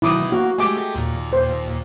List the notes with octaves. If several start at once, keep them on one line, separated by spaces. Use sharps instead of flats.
B2 D#3 F#3 E4 D6 D#6
A#3 F#4
G#3 A3 G4 G#5 D6
D#2 A#2
C5